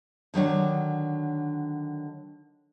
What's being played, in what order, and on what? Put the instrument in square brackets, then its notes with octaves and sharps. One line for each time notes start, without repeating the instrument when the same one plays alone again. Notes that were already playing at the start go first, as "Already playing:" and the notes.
[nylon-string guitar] D3 D#3 F#3 D4